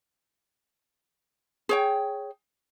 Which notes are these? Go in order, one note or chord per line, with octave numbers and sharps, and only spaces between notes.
G#4 C#5 G5